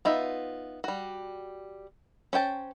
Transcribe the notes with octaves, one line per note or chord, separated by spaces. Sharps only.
B3 D#4 F4 E5
G3 F#4
C#4 C5 G5 A5